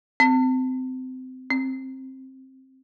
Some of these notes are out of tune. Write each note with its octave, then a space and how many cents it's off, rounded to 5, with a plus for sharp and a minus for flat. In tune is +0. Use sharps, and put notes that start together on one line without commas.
C4 -25
C4 +15